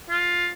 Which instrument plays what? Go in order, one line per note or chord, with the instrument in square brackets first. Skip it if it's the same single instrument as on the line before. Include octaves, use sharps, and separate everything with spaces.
[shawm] F4